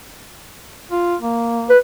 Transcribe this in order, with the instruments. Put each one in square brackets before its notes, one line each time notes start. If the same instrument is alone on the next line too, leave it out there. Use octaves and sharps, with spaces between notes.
[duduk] F4
A#3
[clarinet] B4